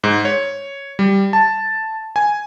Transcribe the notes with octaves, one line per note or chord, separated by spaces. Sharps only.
G#2
C#5
G3
A5
G#5